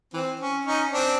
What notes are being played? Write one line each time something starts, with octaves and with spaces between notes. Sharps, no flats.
E3 C4
C#4
C#4 D#4
C4 D4